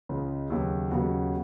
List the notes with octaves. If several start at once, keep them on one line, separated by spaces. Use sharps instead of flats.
C#2 C#3 G#3
D#2 C#3 F#3 B3 F#4
D#2 C#3 F#3 B3 F#4